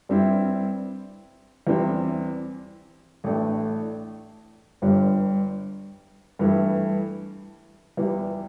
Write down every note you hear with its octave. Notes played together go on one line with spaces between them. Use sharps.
G2 G3 C4 E4
E2 E3 G3 C4
A1 A2 A3 D4
G1 G2 G3
G2 E3 A3 E4
E2 E3 G3